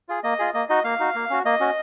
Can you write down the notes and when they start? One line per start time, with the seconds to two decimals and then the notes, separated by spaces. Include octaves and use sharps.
0.09 F4 G#4
0.23 A#3 D#5
0.39 F4 G#4
0.54 A#3 D#5
0.69 D#4 F#4 D#5
0.84 A#3 F5
1.00 D#4 F#4
1.15 A#3
1.30 C#4 F#4
1.45 A#3 D#5
1.60 C#4 F#4